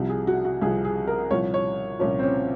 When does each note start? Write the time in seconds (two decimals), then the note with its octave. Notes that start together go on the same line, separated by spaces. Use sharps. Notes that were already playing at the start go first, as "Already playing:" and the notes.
Already playing: C2 C3 F3
0.09 G#4
0.27 F#4
0.45 F#4
0.61 C2 C3 F3 G#4
0.85 G#4
1.07 A#4
1.31 C2 A#2 F3 C#5
1.54 C#5
1.99 C2 A#2 F3 C#4
2.19 C4
2.23 C#4